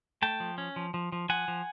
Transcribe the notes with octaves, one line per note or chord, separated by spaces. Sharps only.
A3 G5 A5
F3
C#4
F3
F3
F3
F3 F#5 G#5
F3